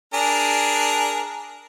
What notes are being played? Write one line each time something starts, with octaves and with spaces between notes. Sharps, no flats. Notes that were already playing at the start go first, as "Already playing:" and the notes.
D4 G#4 A#4